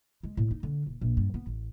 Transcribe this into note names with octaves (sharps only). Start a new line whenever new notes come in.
G#3
A2
D#4
D3
D#1
A#1
G2
B3
A1